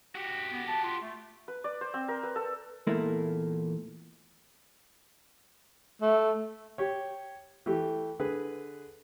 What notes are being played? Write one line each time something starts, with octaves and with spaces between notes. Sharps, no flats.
F#4 G4
B3
A5
F4
A3
B4
D5
C5
C4
A#4
B4
A4
E2 A#2 A3 A#3 E4
A3
G4 C#5
E3 A3 G4
D3 G#4 B4